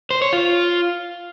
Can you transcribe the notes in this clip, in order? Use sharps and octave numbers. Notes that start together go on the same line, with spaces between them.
C5
C#5
F4